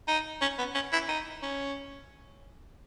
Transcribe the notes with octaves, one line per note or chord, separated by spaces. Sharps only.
D#4
C#4
B3
C#4
E4
D#4
C#4